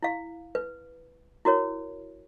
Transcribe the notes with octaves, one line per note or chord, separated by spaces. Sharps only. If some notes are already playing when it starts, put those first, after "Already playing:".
E4 F5
B4
E4 F#4 A#4 C#5